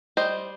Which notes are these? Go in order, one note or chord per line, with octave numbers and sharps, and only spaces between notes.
G3 C5 D#5